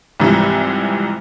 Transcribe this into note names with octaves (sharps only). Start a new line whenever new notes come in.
C2 G#2 C3 E3 F3